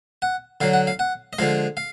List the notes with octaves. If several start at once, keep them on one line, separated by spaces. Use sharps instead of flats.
F#5
D3 F#3 F5
F#5
F5
F#5
D#5
D3 F3 G#3 F5
F5